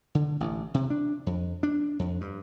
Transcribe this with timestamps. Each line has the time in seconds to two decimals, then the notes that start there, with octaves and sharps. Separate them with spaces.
0.15 D3
0.40 A1
0.74 C3
0.90 D4
1.26 F2
1.63 D4
1.99 F2
2.21 G2